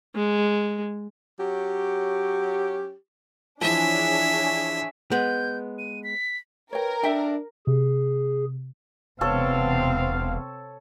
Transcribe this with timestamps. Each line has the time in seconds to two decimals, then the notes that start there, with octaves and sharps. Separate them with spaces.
0.15 G#3
1.40 F#3 C#4 G4
3.61 E3 F3 D4 G#4 C#5 E5
5.11 G#3 B3 G6
5.78 D#7
6.04 B6
6.73 A#4 B4 C#5 G5
7.03 D4 A4 E5 G5
7.67 C3 G#4
9.21 E1 C3 B3 C4 A4 C#5 F5